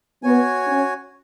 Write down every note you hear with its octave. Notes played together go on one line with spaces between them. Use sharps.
B3 F#4 C#5 G#5
C#4